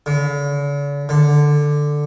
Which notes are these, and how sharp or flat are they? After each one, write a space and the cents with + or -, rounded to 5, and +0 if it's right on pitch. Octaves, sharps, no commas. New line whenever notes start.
D3 -45
D3 +5